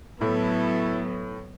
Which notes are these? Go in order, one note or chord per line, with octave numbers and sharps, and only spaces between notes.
A2 F#3 B3 E4 A4